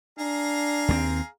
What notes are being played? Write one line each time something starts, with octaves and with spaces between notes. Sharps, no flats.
D4 G#4 F5 A#5
D#2 G#3 C4